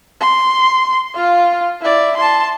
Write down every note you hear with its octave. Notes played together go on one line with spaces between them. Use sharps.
C6
F4 F5
E4 D5
A5 C6